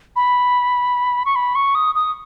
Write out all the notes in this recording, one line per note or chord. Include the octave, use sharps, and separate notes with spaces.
B5
C#6
B5
C#6
D#6
D#6